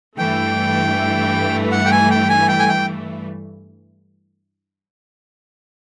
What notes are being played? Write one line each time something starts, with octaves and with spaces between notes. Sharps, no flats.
G2 E3 A3 G5
F#5
G5
G#5
G5
G#5
G5
G#5
G5